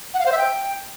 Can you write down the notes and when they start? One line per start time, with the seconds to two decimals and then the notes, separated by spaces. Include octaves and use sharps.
0.14 F#5
0.20 F5
0.26 C5
0.32 E5
0.38 G5